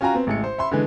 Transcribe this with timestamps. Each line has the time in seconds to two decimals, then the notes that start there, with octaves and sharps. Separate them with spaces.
0.01 C#4 F4 F#4 G5 G#5 A#5
0.14 B3 C4
0.27 A1 G#3 C#7
0.44 C5
0.58 E5 B5 C6
0.71 D3 E3 G#3